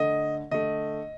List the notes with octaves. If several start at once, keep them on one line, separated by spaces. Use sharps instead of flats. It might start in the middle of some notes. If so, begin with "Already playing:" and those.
Already playing: D3 A3 D#5
D3 A3 D#5